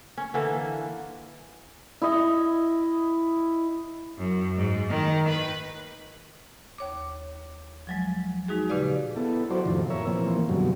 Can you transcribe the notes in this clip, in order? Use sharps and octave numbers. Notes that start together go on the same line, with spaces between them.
C#4
D3 E3 A#3
E4 D#5
F#2
G#2
D#3
B4
D#2 C#5 D6
F3 F#3 G#3
G#3 D#4 F#4 G#4
A#2 C#3 G4 B4 D5 F5
B3 E4 A4
F#3 E4 F#4 A4 C5 D5
F2 A2 C3 D#3 F3
A#4 C#5 E5
A#2 E3 F3 A#3 C4
F#2 B2 D3 F#3 G3